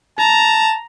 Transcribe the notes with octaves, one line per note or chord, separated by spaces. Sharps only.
A5 A#5